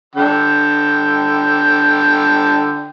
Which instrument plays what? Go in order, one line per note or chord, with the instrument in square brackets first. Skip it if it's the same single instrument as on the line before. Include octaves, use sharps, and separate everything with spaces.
[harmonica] D3 G5